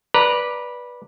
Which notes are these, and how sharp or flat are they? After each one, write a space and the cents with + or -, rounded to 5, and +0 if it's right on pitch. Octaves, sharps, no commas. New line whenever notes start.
B4 -15 D5 +0 A#5 +0